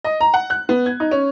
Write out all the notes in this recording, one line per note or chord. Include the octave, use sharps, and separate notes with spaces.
D#5
A#5
F#5
F#6
B3
G#6
D#4
C#4